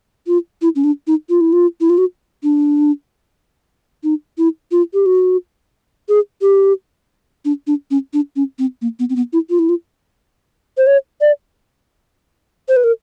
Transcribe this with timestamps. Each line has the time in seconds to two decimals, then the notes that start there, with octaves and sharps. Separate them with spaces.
0.27 F4
0.62 E4
0.76 C#4
0.84 D4
1.07 D#4
1.30 F4
1.41 E4
1.53 F4
1.81 E4
1.90 F4
1.98 F#4
2.43 D4
4.04 D#4
4.38 E4
4.72 F4
4.94 G4
5.06 F#4
6.09 G#4
6.42 G4
7.45 D4
7.67 D4
7.91 C#4
8.13 D4
8.36 C#4
8.59 C4
8.82 A#3
8.99 B3
9.10 C4
9.16 B3
9.33 E4
9.50 F4
9.59 E4
9.69 F4
10.78 C5
10.87 C#5
11.21 D5
12.69 C5
12.76 B4
12.84 A#4